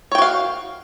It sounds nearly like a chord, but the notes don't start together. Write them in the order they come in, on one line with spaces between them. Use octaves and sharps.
C#5 G5 F#4 F5